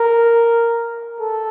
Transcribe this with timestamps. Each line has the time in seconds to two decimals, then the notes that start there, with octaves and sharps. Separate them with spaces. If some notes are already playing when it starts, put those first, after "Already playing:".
Already playing: A#4
1.20 A4